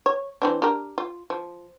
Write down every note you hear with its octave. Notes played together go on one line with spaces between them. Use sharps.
C#5
E3 C4 D4
D4 G4 A#4
F4
F3